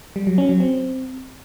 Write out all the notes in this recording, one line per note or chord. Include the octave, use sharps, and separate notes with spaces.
G3
F#3
C#4
F#3
C4